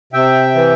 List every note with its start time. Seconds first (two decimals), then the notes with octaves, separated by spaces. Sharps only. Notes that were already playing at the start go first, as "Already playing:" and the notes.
0.13 C3 E5 G5
0.55 E3